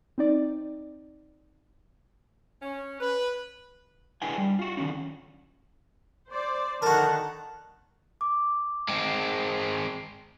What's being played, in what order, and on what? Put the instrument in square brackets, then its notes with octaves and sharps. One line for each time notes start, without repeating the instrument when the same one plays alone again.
[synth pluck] C4 D#4 D5
[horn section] C#4
B4
[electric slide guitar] D4 E4 G#4 B4 G5 G#5
G3
F4 F#4
D3 D#3 F#3 C#4 D#4
[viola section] C5 D5
[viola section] D3 D#3 F#5 [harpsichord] F#4 A#4 [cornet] A5
[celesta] D6
[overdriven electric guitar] G#3 C4